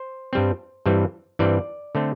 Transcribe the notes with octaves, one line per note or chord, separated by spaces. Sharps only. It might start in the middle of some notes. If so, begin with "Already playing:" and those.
Already playing: C5
G2 G3 C4
G2 E3 G3 C4
G2 E3 G3 C4 D5
D3 A3 C4